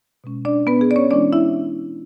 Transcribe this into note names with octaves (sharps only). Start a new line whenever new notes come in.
B2 G#3 C#4
D4 D5
B3 B4
G#4
D5
C#4 C#5
E3 G#3 C#4 D4 E4 D5
E4 E5